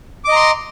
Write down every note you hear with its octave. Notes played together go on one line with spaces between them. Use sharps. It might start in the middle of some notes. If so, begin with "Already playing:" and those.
D#5 A#5 C6 D6